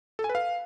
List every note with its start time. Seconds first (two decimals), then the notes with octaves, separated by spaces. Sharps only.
0.19 A4
0.24 G#5
0.29 B4
0.35 F5